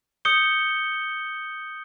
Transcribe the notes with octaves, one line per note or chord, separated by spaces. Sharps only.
D#6 G6 C#7 G7